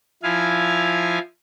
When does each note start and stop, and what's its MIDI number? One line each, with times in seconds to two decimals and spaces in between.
0.23 1.19 53
0.23 1.19 64
0.23 1.19 77
0.23 1.19 80